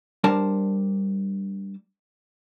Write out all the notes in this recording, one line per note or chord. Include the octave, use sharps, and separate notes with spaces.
G3 D4 A#4 C5 A5